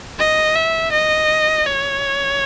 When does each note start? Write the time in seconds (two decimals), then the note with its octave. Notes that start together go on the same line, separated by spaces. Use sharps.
0.20 D#5
0.55 E5
0.92 D#5
1.66 C#5